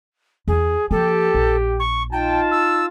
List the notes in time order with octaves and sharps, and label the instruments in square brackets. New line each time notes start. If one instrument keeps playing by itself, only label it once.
[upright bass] E2 [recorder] G#4
[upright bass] F3 A#3 [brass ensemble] G4 [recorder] A4
[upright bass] A#1
[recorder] C#6
[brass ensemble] D#4 F4 A5 [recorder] G5
[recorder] E6